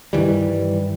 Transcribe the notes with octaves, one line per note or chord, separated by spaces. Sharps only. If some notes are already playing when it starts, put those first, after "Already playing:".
G2 D#3 E3 G3